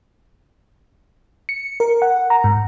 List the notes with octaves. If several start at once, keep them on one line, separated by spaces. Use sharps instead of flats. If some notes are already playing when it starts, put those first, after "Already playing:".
C#7
A#4
F#5
A#5
G#2